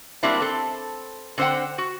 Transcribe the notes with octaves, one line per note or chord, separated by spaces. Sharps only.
F#3 G3 A#3 C4 D4 E4
C4 A4
D3 C4 C5 D5 F#5 G5
F#4